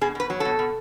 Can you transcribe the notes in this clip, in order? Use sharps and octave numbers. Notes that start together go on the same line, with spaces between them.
B2 G#4
B2 B4
F#3
B2 A4
B2